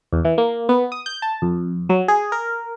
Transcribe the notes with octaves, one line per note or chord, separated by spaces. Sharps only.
E2
E3
A#3
B3
D#6
G6
A5
F2
F#3
G#4
A#4